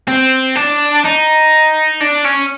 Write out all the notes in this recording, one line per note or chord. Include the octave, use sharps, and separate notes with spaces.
C4
D4
D#4
D4
C#4